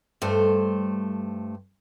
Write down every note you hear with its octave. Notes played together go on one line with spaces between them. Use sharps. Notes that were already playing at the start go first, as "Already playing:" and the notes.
G2 A3 C5